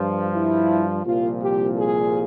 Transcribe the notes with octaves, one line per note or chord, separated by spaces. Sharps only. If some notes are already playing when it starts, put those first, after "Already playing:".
Already playing: G2 F3
E4
C2 A#2 F3 F4
G4
G#4